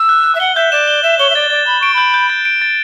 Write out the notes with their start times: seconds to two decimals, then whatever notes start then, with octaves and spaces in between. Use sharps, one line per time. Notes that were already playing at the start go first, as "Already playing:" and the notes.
Already playing: E6
0.09 F#6
0.24 F#6
0.35 E5
0.40 F#5 G7
0.56 E5 G6
0.72 D5 E7
0.87 G7
1.03 E5 E7
1.19 C#5 G7
1.30 E5
1.35 D5 A6
1.50 D5 A6
1.66 B5 G7
1.80 C#6 D7
1.94 B5 G6
2.14 G6
2.30 A6
2.45 D7
2.62 A6